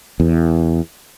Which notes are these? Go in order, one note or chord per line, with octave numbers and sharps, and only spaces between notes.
E2